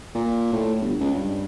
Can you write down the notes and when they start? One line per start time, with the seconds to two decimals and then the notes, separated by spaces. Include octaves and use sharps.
0.15 A#2
0.53 A2
0.81 G1
1.00 C#2
1.15 G2